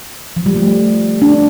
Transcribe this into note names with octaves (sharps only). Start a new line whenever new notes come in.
F3
G3
A3
D4